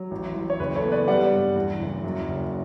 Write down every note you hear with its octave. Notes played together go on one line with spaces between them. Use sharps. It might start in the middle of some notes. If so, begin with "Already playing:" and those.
Already playing: F#3
A1
A1
C#5
F#1 B4
A4 C#5
B3
B4 D5
G3 D5 F#5
G2
E2
F#1
F#2
F#1